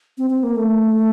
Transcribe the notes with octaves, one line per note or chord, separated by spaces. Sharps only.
C4
C4
A#3
A3